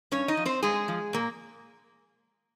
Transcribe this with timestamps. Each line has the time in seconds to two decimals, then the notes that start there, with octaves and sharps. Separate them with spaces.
0.11 G2 C#4 C#5
0.28 D#4 D#5
0.37 F3
0.45 C4 C5
0.63 G2 G#3 G#4
0.88 F3
1.13 A#2 A#3